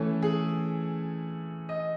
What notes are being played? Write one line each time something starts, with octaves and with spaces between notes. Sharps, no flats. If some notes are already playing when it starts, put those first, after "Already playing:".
Already playing: E3 A3 C#4 A4
G#4
D#5